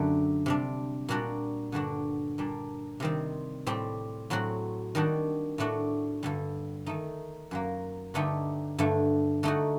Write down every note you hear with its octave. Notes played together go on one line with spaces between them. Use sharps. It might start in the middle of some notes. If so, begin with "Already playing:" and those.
Already playing: F#2 D3 A3 D4 G4
C3 G3 D4
A#2 G3 D4 F#4
G2 D3 G3 D4 F#4
A#2 G3 D4
C3 D#3 G3 C4
A2 G3 C4 G4
A2 F#3 C4 F#4
D#3 G3 D4 F#4
A2 A3 D4 F#4
G2 D3 G3
D#3 A3 D#4
F#2 F#3 A#3
G2 D3 A3 D#4 G4
G2 D3 A3
D3 A3 D#4 F#4